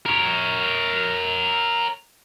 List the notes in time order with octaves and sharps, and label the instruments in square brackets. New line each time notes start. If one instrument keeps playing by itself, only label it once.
[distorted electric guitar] A#4 C#5